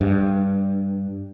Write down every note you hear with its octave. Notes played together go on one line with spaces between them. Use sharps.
G2